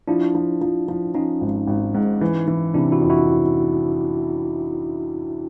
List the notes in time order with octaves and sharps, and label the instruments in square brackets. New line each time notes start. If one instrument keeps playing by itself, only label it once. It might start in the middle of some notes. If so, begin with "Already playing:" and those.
[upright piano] F3 [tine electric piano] D4 E4
[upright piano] F3
F3
F3
[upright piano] F3 [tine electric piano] C#4 D#4
[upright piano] G#1
G#1
G#2
E3
E3
[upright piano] C3 [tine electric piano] D4 E4
[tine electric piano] E4 F#4
[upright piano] F2
[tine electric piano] E4 F#4